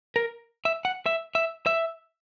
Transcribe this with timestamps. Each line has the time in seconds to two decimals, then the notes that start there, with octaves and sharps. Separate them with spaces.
0.16 A#4
0.65 E5
0.85 F#5
1.06 E5
1.35 E5
1.66 E5